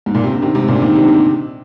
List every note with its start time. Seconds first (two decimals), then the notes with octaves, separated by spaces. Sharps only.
0.06 G#2
0.15 A#2
0.23 C3
0.33 D3
0.42 C3 D#3
0.55 G#2 C3
0.68 A#2 D3
0.82 C3 D#3
0.95 C3 D#3
1.03 D3
1.08 C3